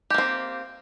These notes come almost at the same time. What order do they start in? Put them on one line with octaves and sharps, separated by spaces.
G4 A#3 C4